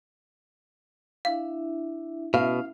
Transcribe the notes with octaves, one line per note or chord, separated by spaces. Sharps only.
D4 E4 E5 F5
B2 C#4 E4 F5